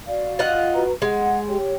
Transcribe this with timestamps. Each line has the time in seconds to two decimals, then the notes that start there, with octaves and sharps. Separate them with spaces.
0.07 F#4 D5 F5
0.39 F4 D#5 F#5
0.74 F#4 B4 A#5
1.02 G#3 F#5
1.48 G4 C#5 G5